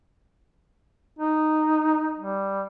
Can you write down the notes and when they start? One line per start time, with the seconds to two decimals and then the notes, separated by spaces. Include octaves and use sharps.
1.19 D#4
2.19 G3